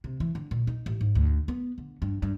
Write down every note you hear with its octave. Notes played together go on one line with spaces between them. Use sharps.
C3
E3
D3
A#2
D#4
A1
G#2
D2
B3
D3
G2
G2